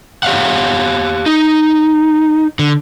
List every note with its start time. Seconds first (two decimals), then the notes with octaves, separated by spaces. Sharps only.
0.23 G4 C#5 F5 F#5
1.26 D#4
2.59 D3